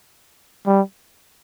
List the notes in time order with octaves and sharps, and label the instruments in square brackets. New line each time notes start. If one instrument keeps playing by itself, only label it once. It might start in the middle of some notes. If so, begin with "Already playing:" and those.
[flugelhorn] G3